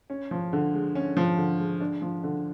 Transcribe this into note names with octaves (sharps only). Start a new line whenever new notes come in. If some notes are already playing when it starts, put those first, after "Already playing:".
C#4
F3
D3
G#3
C#4
F3
D3
G#3
D4
F3
D3